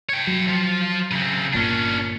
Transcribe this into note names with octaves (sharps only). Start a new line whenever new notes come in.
C#5 G5
F#3
F3 F4
C#3 C4
G1 A#2 C#4 D4